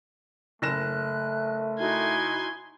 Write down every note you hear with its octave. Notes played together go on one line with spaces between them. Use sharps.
F#1 A3 F#6 A#6 E7
D#4 E4 F#4 G#5 C6